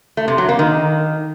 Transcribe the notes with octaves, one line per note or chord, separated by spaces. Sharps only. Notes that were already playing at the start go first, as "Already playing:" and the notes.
A3
C3
F#3
A#3
D#3